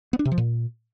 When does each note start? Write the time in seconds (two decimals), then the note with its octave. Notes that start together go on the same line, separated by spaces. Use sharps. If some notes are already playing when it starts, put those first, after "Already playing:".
0.13 B3
0.19 D4
0.25 C3
0.32 F3
0.38 A#2